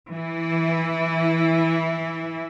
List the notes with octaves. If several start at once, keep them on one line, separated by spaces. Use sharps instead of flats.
E3 E4